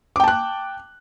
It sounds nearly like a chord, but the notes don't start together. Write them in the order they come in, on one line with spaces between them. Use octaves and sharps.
D6 G5 A5 F#6